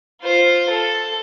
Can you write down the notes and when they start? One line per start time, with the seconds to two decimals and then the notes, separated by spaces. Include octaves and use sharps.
0.21 F4 C5
0.70 A4